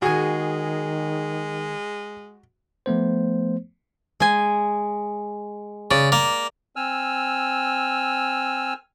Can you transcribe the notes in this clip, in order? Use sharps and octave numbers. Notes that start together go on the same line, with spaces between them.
D#3 G#3 F#4 G#4 G#5
F3 A3 B3 C5
G#3 G#5
C#3 D5
A#3
C4 G#5 E6 F6